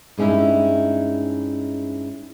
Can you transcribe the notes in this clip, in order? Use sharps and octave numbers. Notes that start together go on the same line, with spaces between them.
G2 G#3 C#4 D#4 E4